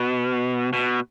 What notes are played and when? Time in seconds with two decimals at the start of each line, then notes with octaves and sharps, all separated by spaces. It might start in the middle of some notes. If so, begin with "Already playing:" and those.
Already playing: B2
0.73 B2